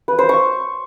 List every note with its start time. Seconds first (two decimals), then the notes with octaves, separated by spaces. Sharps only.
0.08 B4
0.19 C5
0.29 C#6